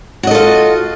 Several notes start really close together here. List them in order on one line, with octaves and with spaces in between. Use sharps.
F#4 D#5 A4 F4